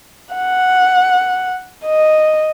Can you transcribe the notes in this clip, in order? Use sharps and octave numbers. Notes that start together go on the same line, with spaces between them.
F#5
D#5